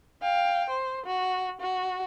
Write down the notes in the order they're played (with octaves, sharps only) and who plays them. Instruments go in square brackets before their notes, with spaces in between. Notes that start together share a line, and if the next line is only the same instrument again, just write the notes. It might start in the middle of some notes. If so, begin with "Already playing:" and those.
[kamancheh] F5 G5
C5
F#4
F#4